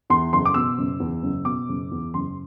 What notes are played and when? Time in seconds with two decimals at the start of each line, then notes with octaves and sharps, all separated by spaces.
0.10 E2 C6
0.33 F#1 C6
0.45 D6
0.54 B2 E6
0.78 F#1
1.00 E2
1.23 F#1
1.45 B2 D6
1.69 F#1
1.91 E2
2.14 F#1 C6